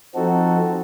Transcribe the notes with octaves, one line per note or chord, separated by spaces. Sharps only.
F3 C4 D#4 F#4 A4